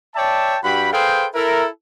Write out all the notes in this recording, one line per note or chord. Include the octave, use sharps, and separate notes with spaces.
C#5 D5 E5 G5 A5
G2 F#4 G5 B5
G#4 A4 B4 C5 F5 G5
E4 A4 A#4